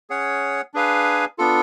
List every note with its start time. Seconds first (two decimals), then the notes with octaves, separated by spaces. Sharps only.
0.10 C#4 G#4 C#5 F#5
0.74 D4 G#4 B4 F5 G#5
1.38 B3 D4 F4 A4